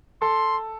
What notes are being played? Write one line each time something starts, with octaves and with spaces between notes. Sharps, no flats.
A4 C6